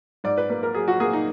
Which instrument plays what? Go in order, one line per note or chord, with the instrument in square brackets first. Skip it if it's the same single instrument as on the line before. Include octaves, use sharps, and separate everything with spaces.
[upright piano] G#2 D5
B4
A#3 B4
A#4
F#3 G#4
F#4
A#3 G#4
D#4